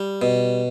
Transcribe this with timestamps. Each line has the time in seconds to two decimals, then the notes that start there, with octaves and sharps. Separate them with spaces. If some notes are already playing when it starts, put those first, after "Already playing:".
Already playing: G3
0.22 B2